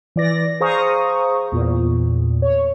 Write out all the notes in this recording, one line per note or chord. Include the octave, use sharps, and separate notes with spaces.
E3 D5 A#6
G#4 C5 F5 A#5 C#6 D#6
E2 A#2
C#5